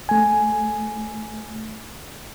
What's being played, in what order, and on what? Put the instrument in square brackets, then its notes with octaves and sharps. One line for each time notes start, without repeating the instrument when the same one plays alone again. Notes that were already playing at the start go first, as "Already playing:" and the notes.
[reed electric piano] A3 G#5